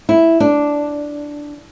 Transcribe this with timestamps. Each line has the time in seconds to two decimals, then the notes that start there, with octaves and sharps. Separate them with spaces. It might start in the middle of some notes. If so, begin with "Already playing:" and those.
0.09 E4
0.40 D4